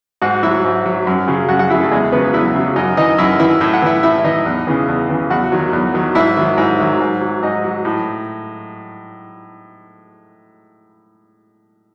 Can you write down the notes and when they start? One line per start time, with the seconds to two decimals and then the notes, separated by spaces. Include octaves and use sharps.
0.22 G#2 F#4 F#5
0.43 F#3 E4 E5
0.64 G#2
0.86 F#3
1.07 F#2
1.27 C#3 F#3
1.49 F#2 F#4 F#5
1.59 F#4 F#5
1.70 C#3 F#3 E4 E5
1.81 A3 A4
1.91 E2 G#3 G#4
2.12 C#3 F#3 B3 B4
2.34 E2 E4 E5
2.55 C#3 F#3
2.76 F#2 D#4 D#5
2.97 E3 D#4 D#5
3.18 F#2 E4 E5
3.40 E3 E4 E5
3.61 A2 E5
3.74 F#5
3.82 E3 E4 E5
4.03 A2 E4 E5
4.18 E5
4.24 E3 D#4 D#5
4.46 E2
4.67 C#3 E3
4.88 E2
5.09 C#3 E3
5.30 E2 F#4 F#5
5.52 D#3 F#3
5.73 E2
5.94 D#3 F#3
6.15 G#2 E4 E5
6.37 D#3 F#3
6.57 G#2 E4 E5
6.79 D#3 F#3
7.00 G#2
7.21 F#3
7.43 G#2 D#4 D#5
7.64 F#3
7.85 A2